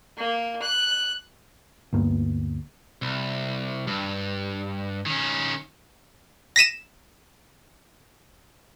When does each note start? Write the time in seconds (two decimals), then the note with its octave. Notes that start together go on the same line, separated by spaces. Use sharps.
0.17 A#3
0.62 F#6
1.93 D2 G2 A#3 B3
3.02 C2
3.87 G2
5.06 D#3 C#4
6.56 A#6 B6 D#7 E7